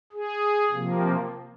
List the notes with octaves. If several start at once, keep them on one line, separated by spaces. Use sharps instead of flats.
G#4
C3 F3 A#3